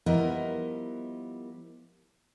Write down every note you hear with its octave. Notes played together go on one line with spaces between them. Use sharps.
F3 G3 B3 E4 A#4 D#5